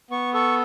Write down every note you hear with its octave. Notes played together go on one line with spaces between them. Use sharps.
B3 C#6
A4 C#6